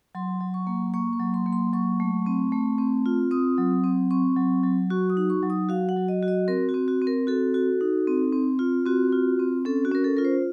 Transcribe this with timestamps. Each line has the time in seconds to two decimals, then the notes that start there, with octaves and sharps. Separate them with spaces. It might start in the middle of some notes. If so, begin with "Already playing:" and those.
0.15 F#3 C6
0.40 F#3
0.54 C#6
0.67 A#3
0.94 A#3 C#6
1.13 C#6
1.20 F#3
1.34 C6
1.46 A#3
1.53 C6
1.73 F#3 C#6
2.00 A3
2.26 C4
2.52 A3
2.78 C4
3.06 F4
3.31 C4 D#6
3.58 F#3
3.84 C4
4.11 C4 C#6
4.37 F#3
4.63 F#3
4.90 F#4 C#6
5.10 D#6
5.17 D#4
5.30 C#6
5.43 F#3
5.50 D#6
5.69 F#4 F5
5.89 F#5
5.96 F#3
6.08 D#5
6.23 F#4
6.28 D#5
6.48 C4 A#4
6.69 F#4
6.74 C4
6.88 F#4
7.02 C4
7.07 A#4
7.27 F#4 A4
7.54 F#4
7.81 D#4
8.07 C4
8.33 C4
8.59 F4
8.86 C4 F#4
9.12 F4
9.39 C4
9.65 C#4 A4
9.85 F#4
9.92 C#4 A#4
10.04 A4
10.17 F4 A#4
10.25 C5